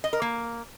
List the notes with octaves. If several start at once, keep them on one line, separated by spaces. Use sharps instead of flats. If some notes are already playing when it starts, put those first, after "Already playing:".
D#5
A#4
A#3